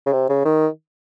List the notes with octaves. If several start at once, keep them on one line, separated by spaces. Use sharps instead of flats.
C#3
C3
C#3
D#3